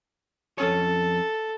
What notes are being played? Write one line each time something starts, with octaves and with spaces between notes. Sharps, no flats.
F2 C#4 A4 C#5